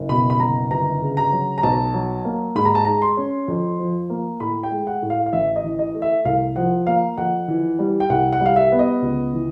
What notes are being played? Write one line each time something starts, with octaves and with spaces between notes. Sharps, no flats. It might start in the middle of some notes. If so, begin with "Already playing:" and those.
Already playing: F#1
B2 B5
B5
F#1 A#5
G1 A#5
C#3
A#5
F#3
A#5
B1 A5
F#3
A#3
G#2 B5
A#5
A5
G#3 A#5
C6
C#4
F2
F3
A#3
A2 B5
G5
G#3
F#5
A2
F5
F5
A1 E5
D#5
E3
D#5
A3
E5
C2 F5
F3 F#5
A#3 F5
F2 F#5
E3
G3
G5
C2 F#5
F#5
G3
F5
E5
B3
D#5
C#2
E3